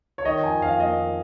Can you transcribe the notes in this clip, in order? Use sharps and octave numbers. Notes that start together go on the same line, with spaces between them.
C#5
D#3 D#5
F2 G#5
F2 F5
A#3 D#5
D#3